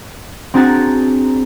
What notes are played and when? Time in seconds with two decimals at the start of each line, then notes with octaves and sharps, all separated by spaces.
0.54 C4 D4 F#4 G#4 A#5 A6